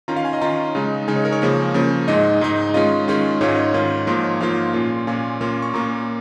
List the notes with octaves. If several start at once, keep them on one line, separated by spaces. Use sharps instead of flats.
D#3 C#4 F4 A#5
F5
G#5
D#5
D#3 C#4 F4 A#5
C#3 G#3 D#4
C#3 G#3 D#4 G#5
C#5
A#4
C#5
C#3 F3 A#3 C#4
C#3 F3 A#3 C#4
G#2 G#3 D#4 D#5
G#2 G#3 D#4
D#3 G#3 C#4 F4 D#5
D#3 G#3 C#4 F4
G#2 D#3 C#4 F4 C#5
D#5
C#5
G#2 D#3 C#4 F4
G#2 F3 A#3 F4 A#4
C#5
G#2 F3 A#3 F4 F5
A#2 A#3 C#4 F4
A#2 A#3 C#4 F4 G#5
A#2 A#3 C#4 F4
C#6
A#2 A#3 C#4 F4 A#5